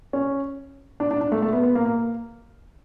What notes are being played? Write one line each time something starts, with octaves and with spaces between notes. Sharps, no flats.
C#4
D4
D4
D4
A3
A3
B3
B3
A#3
A#3